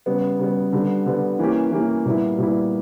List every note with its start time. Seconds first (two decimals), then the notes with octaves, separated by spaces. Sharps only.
0.06 C#3 G3 B3
0.39 C#3 G3 B3
0.73 D3 G3 B3
1.06 D3 G3 B3
1.39 E3 A#3 C#4 G4
1.72 E3 A#3 C#4 G4
2.06 A#2 G3 B3 E4
2.38 A#2 G3 B3 E4